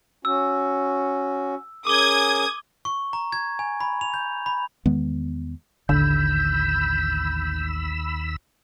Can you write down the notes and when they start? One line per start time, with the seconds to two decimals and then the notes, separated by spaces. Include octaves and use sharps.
0.25 C#4 F#4 E6
1.87 C#4 G#4 A#4 D6 D#6 G#6 G7
2.85 C#6
3.13 A#5
3.32 G#6
3.59 G#5
3.80 B5
4.01 F7
4.14 G6
4.46 B5
4.86 E2 D#3 G#3 B3
5.89 A1 D#2 D3 B5 E6 G6